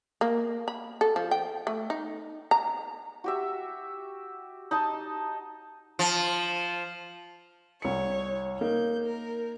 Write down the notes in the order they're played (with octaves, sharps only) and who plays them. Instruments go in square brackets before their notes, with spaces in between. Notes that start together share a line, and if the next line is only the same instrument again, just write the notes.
[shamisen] A#3
B5
A4
F3
G5
A3
D#4
A#5
[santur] F#4 G4 E5
D#4 D#5 A5
[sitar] F3
[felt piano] C2 C#7 [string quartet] C#5
[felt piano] A#3 D#4 [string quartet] G6
[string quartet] A#4